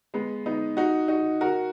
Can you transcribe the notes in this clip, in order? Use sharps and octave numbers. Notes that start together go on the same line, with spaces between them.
G#3 B3
B3 D#4
D#4 F#4
D#4 F#4
F#4 A#4